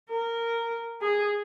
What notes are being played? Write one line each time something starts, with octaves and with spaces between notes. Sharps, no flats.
A#4
G#4